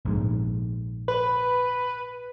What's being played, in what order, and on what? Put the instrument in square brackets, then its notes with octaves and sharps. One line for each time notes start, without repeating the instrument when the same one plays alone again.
[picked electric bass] A#1 G#2
[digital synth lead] B4